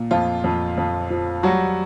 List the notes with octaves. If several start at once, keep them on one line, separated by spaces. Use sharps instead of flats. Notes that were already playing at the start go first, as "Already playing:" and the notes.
Already playing: A#2
F2 F3 F4
F2
F2
F3
F#3 G3 F#4